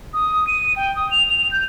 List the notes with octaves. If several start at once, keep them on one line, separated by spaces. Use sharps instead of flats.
D#6
D#7
G5
D#6
F7
F7
G6